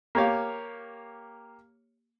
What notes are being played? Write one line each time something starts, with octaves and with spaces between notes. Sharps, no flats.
A#3 G4 C#5 F5